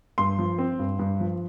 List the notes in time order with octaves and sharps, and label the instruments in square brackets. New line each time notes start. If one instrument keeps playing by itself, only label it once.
[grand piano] G2 C6
F3
C4
G2
G2
F3